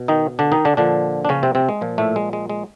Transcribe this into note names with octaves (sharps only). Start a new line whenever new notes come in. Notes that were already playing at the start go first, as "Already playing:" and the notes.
Already playing: B2
D#3 D#4
D3 D4
D#3 D#4
D3 D4
A#2 D3 F3 D4
D4
C#3 C#4
C3 C4
C3 C4
G#3
A#2 F3
A2 A3
G#3
G#3
G#3